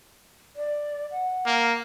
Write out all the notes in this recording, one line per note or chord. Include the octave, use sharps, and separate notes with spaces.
D5
F#5
A#3